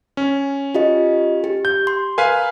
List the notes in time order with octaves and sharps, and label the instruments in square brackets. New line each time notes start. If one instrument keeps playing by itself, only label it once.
[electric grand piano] C#4
[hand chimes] F4 G4 D#5
G4
[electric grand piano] G6
[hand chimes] C6
[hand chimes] A#4 [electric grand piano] B4 F5 G#5